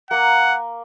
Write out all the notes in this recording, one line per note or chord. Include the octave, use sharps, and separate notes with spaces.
A#3 F#5